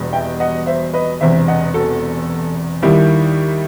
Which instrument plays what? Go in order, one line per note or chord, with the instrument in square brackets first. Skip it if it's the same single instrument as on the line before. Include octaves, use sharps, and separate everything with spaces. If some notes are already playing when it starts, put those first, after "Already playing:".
Already playing: [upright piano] E1 E2 B2 G3
E5 G5
D#5 F#5
C5 E5
B4 D#5
E1 E2 C3 C5 E5
D#5 F#5
F#4 A4
D#2 D#3 G3 E4 G4